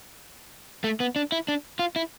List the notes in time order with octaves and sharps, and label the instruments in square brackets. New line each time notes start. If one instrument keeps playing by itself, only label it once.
[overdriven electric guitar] A3
B3
D4
E4
D4
F4
E4